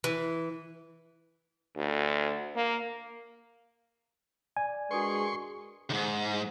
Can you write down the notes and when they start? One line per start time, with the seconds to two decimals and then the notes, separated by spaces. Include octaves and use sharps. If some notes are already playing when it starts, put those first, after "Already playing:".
0.04 E3
1.76 D2
2.56 A#3
4.57 D5 G#5
4.91 G#3 D4 F#4 G#4 A#4 B4 C6 C#6
5.90 D2 G#2